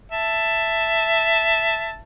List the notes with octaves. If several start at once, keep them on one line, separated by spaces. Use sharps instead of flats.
E5 A5